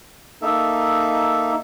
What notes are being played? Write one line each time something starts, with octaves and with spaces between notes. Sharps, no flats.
A#3 D#4 A4 E5